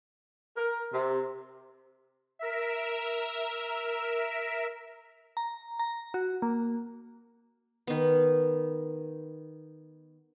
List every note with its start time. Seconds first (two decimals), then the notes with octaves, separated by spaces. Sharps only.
0.57 A#4
0.93 C3
2.39 A#4 E5
5.37 A#5
5.79 A#5
6.14 F#4
6.42 A#3
7.87 D#3 B3